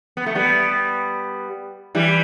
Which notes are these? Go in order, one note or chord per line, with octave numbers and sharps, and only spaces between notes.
B3
A3
G3 B3
E3 G3